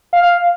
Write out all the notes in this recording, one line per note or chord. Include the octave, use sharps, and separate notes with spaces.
F5